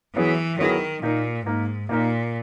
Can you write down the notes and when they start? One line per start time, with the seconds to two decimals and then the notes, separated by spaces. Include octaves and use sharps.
0.15 E3 F#3 B3 E4 G#4
0.58 D#3 F#3 B3 E4 G#4
1.03 A#2 A#3 D#4 A#4
1.46 G#2 A#3 D#4 A#4
1.89 A#2 A#3 D#4 A#4